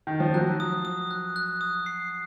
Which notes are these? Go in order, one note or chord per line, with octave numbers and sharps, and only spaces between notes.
D#3
F3
F#3 F#6
D#6
D#6
F#6
F#6
D#6
C7